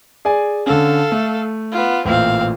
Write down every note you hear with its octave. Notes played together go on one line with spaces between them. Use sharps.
G#4 D5 G#5
D3 C#4 A4 F5
A3
B3 F4
A1 A#2 C4 F5